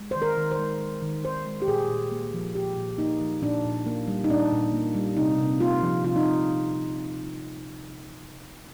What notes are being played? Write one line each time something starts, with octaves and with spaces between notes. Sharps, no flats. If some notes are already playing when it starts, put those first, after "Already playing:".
Already playing: G#3
D#3 C5
A#4
D#3
C5
G#3
G#3
D#3
D#3 C5
G#3
G4
A#2 G#4
A#2
A#3
F3
A#2 G4
A#2
A#3 D#4
F3
A#2 D4
A#2
A#3
G3
D#4
A#2 D4
A#2
A#3
G3
C3 D#4
C3
A#3 F4
F3
C3 F4
D#4